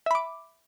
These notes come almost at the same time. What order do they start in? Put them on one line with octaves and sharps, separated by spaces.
E5 B5 D6